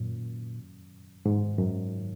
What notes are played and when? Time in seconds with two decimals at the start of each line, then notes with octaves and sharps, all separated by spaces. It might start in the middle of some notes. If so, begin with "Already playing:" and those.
Already playing: F#2 A#2
1.26 G#2
1.59 F#2